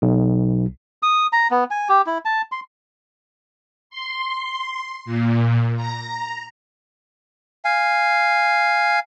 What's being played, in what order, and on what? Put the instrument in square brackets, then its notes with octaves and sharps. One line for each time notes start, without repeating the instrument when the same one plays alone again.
[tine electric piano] B1
[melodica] D#6
A#5
B3
G#5
G4
E4
A5
C6
[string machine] C6
A#2
A#5
[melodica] F5 G#5